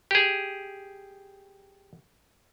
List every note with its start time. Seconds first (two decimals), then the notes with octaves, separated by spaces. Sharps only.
0.11 G4 G#4